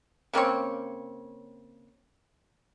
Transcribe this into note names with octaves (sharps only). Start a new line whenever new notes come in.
C#3 A#3 C4 C#5